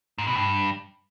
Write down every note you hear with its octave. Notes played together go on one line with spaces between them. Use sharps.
G#2
B2
G2